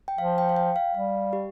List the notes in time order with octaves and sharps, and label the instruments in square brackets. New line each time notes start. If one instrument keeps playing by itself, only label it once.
[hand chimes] G5
[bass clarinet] F3 [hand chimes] F5
[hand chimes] G5
F5
G5
F5
[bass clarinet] G3 [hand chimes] F5
[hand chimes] G4